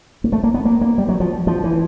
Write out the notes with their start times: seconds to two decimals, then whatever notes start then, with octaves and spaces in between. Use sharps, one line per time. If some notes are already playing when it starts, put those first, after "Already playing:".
0.24 A#3
0.32 A3
0.44 A#3
0.54 B3
0.65 A#3
0.81 A#3
0.98 G3
1.09 F#3
1.20 F3
1.47 F3
1.64 E3